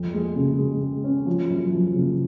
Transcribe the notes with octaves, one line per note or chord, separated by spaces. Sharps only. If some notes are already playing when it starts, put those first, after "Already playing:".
Already playing: F2
G#3
C#3
G#3
G#3
C#4
F3
F#2
F3
C#3